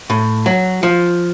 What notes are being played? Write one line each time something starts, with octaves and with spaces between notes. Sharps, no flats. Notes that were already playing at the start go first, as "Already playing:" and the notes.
A2
F#3
F3